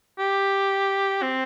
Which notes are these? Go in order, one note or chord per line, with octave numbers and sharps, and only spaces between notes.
G4
C4